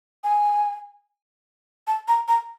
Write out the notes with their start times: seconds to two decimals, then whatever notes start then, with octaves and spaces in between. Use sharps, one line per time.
0.24 G#5
1.87 A5
2.08 A#5
2.28 A#5